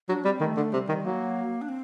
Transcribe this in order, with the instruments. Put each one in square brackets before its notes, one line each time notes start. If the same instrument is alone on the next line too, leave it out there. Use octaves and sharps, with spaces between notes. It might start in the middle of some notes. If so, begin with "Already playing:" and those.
[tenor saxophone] F#3 [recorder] D4
[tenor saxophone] G3 [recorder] C4
[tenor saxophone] D#3 [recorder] A3
[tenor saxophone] D3
[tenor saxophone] C3 [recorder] G3
[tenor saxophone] D#3
[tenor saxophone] F#3 [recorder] A#3
[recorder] D4
C4